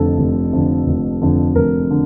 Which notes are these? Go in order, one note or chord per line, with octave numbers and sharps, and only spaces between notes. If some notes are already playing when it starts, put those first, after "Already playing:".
Already playing: F1 F2 D3 A4
F1
F2 D3
F1
F2 D3
F1 A#4
D3